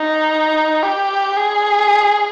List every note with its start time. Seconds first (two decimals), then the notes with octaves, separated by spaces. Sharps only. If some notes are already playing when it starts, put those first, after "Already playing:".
Already playing: D#4
0.83 G4
1.37 G#4